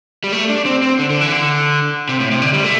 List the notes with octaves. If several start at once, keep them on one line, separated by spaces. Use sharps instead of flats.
G3
A3
D4
C4
C4
D3
D3
E3
D3
C3
A2
C3
D3
G3
A3